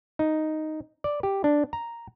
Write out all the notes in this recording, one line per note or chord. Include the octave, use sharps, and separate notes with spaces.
D#4
D5
G4
D4
A#5